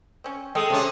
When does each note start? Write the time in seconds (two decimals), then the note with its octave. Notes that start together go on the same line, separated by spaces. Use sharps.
0.24 C4 C#4
0.55 G#3 A4 G5 A5 D#6
0.70 C3 C#4